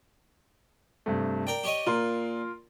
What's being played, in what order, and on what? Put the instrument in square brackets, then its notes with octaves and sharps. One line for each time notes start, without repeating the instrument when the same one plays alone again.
[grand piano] G2 C3 A3
[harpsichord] A#4 G5 [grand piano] D5
[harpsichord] G4 C#5 D#5
[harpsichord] A#2 [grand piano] F4 A#4 C6